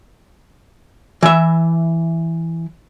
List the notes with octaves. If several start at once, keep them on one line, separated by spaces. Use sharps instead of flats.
E3 E5